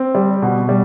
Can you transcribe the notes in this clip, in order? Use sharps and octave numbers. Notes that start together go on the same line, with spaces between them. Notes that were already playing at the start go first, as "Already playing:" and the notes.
Already playing: C4
G3
B2
G3